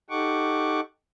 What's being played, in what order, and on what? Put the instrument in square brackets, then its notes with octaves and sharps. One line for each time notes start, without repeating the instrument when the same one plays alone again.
[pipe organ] D#4 G4 A4 F#5 C#6 D6